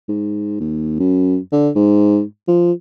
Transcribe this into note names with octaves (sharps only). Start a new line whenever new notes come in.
G#2
D#2
F#2
D3
G#2
F3